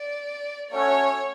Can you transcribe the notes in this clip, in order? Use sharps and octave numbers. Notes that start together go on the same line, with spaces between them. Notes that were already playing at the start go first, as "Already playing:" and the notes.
Already playing: D5
A3 C#4 F#4 C#5